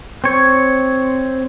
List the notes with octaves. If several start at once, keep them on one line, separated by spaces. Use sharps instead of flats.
C4 C#5